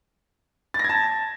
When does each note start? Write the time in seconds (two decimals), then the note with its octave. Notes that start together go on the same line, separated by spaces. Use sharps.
0.74 A6
0.79 A#6
0.84 G#6
0.89 A5